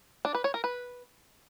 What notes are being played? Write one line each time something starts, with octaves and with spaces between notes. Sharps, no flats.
D4
B4
C#5
A#4
B4